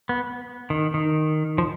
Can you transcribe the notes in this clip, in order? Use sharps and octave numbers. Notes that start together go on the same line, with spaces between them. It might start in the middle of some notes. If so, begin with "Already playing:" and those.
B3
D#3
D#3
F3